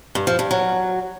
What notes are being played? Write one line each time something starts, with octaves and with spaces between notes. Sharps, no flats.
G2
F3
G2
F#3